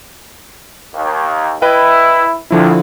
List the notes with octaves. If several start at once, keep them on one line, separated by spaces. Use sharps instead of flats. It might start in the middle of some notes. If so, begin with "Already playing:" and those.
D#2
E4 B4 D#5 G5
C2 D3 F3 E4